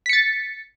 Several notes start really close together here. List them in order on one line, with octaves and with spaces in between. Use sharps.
B6 C#7 A6